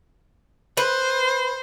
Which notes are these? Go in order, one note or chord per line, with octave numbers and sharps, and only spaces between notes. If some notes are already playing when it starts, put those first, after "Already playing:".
B4 C5